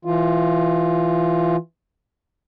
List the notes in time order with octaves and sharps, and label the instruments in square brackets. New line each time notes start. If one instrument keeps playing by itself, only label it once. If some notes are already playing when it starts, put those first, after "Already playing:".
[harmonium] E3 F4